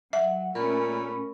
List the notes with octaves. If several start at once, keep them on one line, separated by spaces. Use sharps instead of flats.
F#3 E5 F#5
A#2 A3 C#4 A#4 B5 C#6